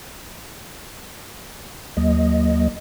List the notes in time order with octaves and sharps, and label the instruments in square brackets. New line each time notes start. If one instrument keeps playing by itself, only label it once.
[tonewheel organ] D#2 F#3 A#3 D#5